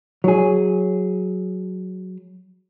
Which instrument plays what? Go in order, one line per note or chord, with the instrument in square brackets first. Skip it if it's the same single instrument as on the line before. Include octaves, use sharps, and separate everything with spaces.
[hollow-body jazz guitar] F#3 G#4